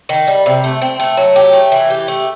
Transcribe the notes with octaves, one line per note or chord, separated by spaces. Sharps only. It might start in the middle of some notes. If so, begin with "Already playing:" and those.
D#3
G3
C3
A3
C4
A3
F#3
G4
A3
E3
G4
A3